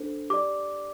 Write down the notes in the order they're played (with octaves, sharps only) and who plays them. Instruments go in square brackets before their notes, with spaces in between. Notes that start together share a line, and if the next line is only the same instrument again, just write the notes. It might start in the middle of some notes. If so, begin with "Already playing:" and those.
Already playing: [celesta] D4 A4 C5
G4 D5 D6